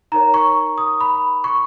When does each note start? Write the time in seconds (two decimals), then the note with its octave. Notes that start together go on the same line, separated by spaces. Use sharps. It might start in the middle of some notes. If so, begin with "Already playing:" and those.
0.12 D#4 A#4 C#5 A#5
0.34 C#6
0.78 D#6
1.01 B5
1.44 C#6